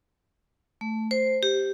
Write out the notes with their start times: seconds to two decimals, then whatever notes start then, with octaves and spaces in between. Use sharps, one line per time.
0.81 A3
1.11 C5
1.43 G4